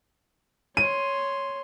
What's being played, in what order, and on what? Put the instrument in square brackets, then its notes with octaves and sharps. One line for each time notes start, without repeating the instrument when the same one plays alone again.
[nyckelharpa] C#5 C6 [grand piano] D#7